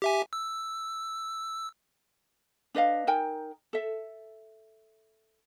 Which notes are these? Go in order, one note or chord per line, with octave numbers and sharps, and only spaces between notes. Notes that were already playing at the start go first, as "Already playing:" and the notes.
G4 E5 G#5
E6
D4 B4 D#5 F5
D#4 A#4 G5 G#5
A4 E5